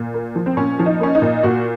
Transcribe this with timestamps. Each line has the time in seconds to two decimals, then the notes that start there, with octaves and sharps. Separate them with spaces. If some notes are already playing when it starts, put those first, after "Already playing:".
Already playing: A#2
0.14 A#3
0.35 F3
0.46 C4
0.57 A#2 C#4
0.79 F3
0.86 D#4
1.00 A#3 C#4
1.15 D#4
1.22 A#2
1.43 A#2 F#4